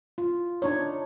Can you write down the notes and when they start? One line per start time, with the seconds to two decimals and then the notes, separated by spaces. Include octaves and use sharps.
0.18 F4
0.62 D4 D#4 C#5